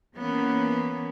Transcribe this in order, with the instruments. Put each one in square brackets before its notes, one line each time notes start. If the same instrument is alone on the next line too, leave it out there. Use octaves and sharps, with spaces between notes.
[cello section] E3 A#3 B3 C#4